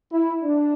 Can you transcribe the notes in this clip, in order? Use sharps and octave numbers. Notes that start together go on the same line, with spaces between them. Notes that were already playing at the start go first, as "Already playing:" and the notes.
E4
D4